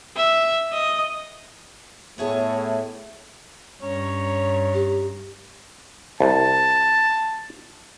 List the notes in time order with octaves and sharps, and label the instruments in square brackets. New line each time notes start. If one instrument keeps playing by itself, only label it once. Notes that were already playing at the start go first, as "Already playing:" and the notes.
[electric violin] E5
D#5
[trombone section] A2 A3 [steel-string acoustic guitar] B3 G#4 C#5
[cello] G2 [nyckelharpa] C#4 A#5 [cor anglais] C#5
[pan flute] G4
[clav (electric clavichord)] C2 [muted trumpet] A5